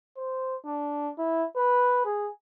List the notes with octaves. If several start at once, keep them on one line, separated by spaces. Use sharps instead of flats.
C5
D4
E4
B4
G#4